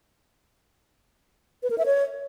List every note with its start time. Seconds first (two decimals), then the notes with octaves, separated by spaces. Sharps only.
1.63 B4
1.70 A#4
1.78 E5
1.86 C#5